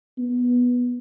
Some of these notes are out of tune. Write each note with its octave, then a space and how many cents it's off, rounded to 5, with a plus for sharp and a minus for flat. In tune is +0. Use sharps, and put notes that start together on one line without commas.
B3 -10